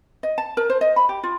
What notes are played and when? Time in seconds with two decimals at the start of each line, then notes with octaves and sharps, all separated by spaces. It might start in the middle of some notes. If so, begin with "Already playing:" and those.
0.23 D#5
0.38 A5
0.57 A#4
0.70 C5
0.81 D#5
0.96 B5
1.09 G4
1.23 F4